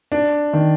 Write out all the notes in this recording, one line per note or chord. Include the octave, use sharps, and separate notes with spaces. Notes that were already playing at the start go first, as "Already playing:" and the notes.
D4
D#3